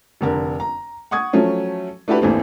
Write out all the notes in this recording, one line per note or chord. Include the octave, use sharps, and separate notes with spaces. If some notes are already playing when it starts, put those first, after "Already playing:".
F1 D3 A#4
A#5
F#5 C#6 D#6 G#6
F3 F#3 A3 C#4
A3 D4 E4 F#4 G4 B4
G#1 D#2 E3 A3 C4